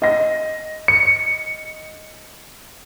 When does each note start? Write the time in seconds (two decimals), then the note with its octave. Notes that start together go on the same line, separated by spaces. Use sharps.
0.02 D#5 A#6
0.88 C#7